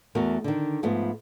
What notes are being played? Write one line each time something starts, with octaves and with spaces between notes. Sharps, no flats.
E2 A3 F#4 A#4
D3 D#3
G#2 F3 A3 B3